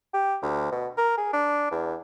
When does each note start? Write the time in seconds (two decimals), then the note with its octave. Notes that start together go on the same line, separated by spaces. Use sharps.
0.14 G4
0.42 D2
0.72 B2
0.98 A#4
1.18 G#4
1.33 D4
1.71 E2